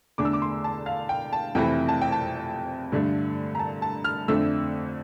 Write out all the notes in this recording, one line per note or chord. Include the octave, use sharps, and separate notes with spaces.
E2 D3 A3 D4 D6
E6
D6
C6
A5
F5
G5
A5
F2 C3 E3 A3 E4 G5
A5
G5
A5
G2 D3 A3 D4
A#5
A5
A5
F6
F2 D3 A3 D4 E6